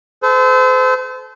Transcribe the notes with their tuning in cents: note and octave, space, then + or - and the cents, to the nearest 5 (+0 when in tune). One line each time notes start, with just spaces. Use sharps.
A4 -30 C5 -35